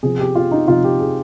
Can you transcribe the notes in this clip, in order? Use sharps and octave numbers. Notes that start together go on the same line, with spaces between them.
C3 F3 G#4
G4
F4
D#4
C3 F3 F4
G4
G#4